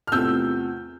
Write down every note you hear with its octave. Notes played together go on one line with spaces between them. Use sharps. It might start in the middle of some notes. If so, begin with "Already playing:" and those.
F6
E2 C3 F3 A3 C4 E6 G6